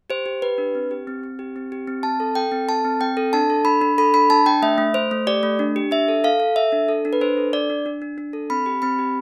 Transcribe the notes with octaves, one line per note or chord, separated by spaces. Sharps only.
G4 C5
G4
G4 B4
D4
C4
G4
C4
C4
G4
C4
G4
C4
C4 A5
A4
A4 G5
C4
A4 A5
C4
C4 G5
A4
D4 A5
A4
D4 B5
D4
A4 B5
D4 B5
D4 A5
D4 G5
A3 E5
A3
A3 C5
A3
G4 D5
A3
D4
G4
D4 E5
A4
A4 F5
A4
A4 E5
D4
A4
D4
B4
D4 C5
A4
D4 D5
D4
D4
D4
D4
A4
C4 B5
G4
C4 B5
G4